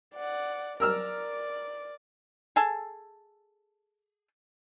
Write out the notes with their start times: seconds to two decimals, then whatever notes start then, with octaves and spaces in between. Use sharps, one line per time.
0.14 D5 F#5
0.80 A#4 D5 E6 F6
2.56 G#4 A4